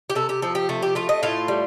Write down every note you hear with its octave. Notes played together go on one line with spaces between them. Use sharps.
G4
C3 A4
G4
F3 A4
G4
C3 A3
G4
A3 F4
D#5
A2 F4
G3